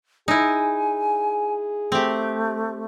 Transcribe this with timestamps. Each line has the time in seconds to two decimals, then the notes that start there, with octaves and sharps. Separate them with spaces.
0.28 D#4 E4 G#4 G#5
1.92 A3 C4 G4